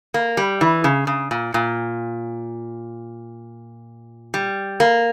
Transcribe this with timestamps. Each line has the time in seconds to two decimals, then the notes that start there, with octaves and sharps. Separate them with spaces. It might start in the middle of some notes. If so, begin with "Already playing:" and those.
0.14 A#3
0.37 G3
0.61 E3
0.84 C#3
1.07 C#3
1.31 A#2
1.54 A#2
4.34 G3
4.80 A#3